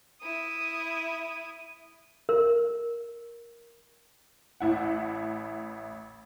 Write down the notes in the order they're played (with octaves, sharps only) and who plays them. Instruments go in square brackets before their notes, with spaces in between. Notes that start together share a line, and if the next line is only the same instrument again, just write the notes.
[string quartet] E4 D#6
[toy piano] A#4
[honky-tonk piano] A1 E4 F#5